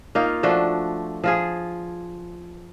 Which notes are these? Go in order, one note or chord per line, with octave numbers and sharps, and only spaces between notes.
A#3 D#4 F4
F3 A3 D4 F#4
F3 F4 G#4